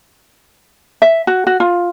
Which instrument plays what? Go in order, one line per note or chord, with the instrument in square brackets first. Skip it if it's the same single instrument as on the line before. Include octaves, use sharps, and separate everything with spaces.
[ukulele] E5
F#4
F#4
F4